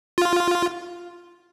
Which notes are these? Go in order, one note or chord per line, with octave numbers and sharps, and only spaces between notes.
F4